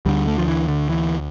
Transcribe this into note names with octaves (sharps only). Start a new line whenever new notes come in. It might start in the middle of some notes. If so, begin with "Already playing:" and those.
D2 D3 G3
A3
F3
E3
D3
E3